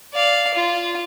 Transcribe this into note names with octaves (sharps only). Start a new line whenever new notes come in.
D5 F5
F4